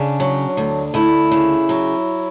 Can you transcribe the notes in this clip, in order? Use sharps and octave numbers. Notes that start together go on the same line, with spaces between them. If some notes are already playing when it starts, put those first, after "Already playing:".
Already playing: C#3 D4
F#3
D2
D2 E4
C#3
F#3